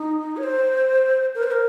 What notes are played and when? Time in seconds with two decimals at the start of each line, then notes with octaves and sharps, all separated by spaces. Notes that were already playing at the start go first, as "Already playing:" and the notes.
Already playing: D#4
0.37 C#5
0.43 C5
1.35 A#4
1.43 C5
1.51 A#4